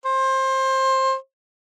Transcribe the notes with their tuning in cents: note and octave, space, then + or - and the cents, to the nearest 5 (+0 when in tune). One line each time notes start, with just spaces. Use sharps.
C5 +20